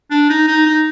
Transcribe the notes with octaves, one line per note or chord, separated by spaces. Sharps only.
D4
D#4
D#4
D#4